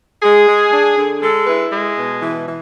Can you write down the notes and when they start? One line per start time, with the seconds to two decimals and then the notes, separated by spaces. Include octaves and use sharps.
0.23 G#3 G#4
0.47 G#3
0.72 D4
0.97 D3
1.22 G#3 A4
1.47 E4 B4
1.73 G#3
1.97 B2
2.22 E3
2.47 E3